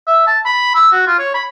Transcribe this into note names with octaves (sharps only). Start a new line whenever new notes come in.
E5
A5
B5
E6
F#4
F4
C#5
B5